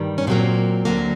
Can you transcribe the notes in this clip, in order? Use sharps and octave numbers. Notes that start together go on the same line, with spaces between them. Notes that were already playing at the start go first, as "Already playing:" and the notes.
Already playing: G2 D#3 G3
C#4
A#2 F#3 A#3 C4
D2 D3 F#3 A#3